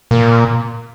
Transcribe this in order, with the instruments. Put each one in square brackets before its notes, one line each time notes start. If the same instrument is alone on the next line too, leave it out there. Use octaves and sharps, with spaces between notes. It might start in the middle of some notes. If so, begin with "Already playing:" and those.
[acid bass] A#2